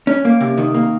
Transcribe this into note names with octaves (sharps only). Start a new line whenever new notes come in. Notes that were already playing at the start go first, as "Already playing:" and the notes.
C#4
A#3
C3
D#3
A#3